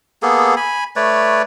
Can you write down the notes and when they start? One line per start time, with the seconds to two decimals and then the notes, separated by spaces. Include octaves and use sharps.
0.23 A#3 B3 G#4 A4
0.56 G#5 B5
0.96 A3 B4 C#5 D5